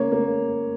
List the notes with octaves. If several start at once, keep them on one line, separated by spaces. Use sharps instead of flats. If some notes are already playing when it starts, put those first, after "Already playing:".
Already playing: C#3 A#3 C#5
A#3